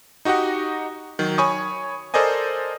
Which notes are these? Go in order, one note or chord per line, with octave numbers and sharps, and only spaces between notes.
D#4 F#4 G4 D#5 F#5
D#3 F#3
C#5 G#5 B5 C#6 D#6
A4 A#4 C5 D5 D#5 G#5